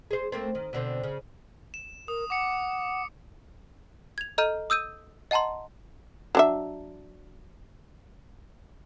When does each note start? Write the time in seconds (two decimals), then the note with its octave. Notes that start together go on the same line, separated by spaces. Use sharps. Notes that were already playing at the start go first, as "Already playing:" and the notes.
0.11 G#4 C5
0.32 A3 A#3 C4
0.55 D#3
0.73 B2 D3 C4
1.03 C#3
1.74 E7
2.08 A#4 D#6
2.30 F#5 D6 C#7
4.18 G#6 F7
4.38 A4 D#5 A#5 F6 G6 D#7
4.70 D#6 E6 G6 D#7
5.31 D#5 F#5 A5 A#5 C6
6.35 F#3 D4 E5